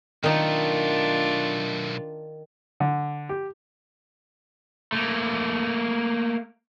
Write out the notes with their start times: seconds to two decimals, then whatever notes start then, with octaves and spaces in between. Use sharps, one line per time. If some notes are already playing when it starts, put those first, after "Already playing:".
0.23 B1 D#3 A3 D4 D#4 F4
2.80 D3
3.29 G4
4.92 A3 A#3